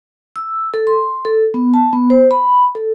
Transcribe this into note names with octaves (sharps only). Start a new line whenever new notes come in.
E6
A4
C6
A4
B3
A5
B3
C5
B5
A4